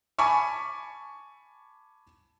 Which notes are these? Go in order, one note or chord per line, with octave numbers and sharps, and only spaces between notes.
G#5 A5 B5 C#6 D6